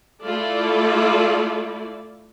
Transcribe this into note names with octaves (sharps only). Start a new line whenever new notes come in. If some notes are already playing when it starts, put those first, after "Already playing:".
A3 E4 F4 A4 D5